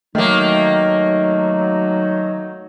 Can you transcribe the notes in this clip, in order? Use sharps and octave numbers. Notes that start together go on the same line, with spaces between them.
D#3 F#3 A3 A#3 D#4